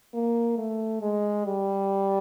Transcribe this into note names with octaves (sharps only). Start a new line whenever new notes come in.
A#3
A3
G#3
G3